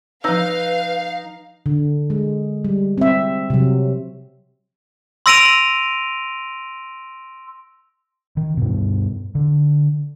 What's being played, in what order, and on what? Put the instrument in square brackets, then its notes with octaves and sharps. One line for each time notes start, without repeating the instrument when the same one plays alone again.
[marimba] F3 E6 [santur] D#4 [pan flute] B4 [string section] F5
[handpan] D3
G#3
G3
C4 E5
C3 F#3
[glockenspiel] C6 E6 A#6 D7 D#7 F7
[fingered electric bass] D#3
G2 B2
D3